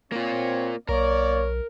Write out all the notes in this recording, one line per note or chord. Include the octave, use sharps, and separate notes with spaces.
A#3 C4 F4 C#5
B1 A#3 A#4 C#5 D5